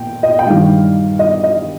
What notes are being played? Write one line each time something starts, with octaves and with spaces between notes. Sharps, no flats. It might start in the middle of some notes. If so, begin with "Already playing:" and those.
Already playing: A#2 G5
D#5
G5
G2 D#3 G3 F5
D#5
D#5